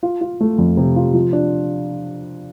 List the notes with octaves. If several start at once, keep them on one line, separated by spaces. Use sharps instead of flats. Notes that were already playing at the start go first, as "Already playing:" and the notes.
F4
F4
A3
F2
C3
F4
F3
D4